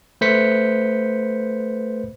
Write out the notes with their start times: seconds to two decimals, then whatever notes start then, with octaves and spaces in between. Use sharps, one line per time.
0.21 A3 B4 C5 G6 B6 C#7